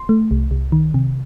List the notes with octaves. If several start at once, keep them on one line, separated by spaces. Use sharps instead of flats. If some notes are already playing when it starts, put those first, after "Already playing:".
Already playing: C6
A3
C2
C2
D#3
C3